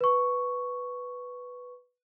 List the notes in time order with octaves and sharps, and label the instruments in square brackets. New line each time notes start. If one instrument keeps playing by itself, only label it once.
[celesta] B4 C#6